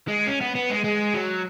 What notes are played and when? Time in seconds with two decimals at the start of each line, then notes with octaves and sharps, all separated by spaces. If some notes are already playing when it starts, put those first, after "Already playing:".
0.08 G#3
0.27 C#4
0.41 B3
0.55 B3
0.70 G#3
0.84 G#3
1.14 F#3